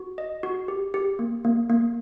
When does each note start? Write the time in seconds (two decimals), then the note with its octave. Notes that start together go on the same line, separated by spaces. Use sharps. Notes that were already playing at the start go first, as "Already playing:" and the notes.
Already playing: F#4
0.18 D#5
0.43 F#4
0.68 G4
0.94 G4
1.19 A#3
1.45 A#3
1.70 A#3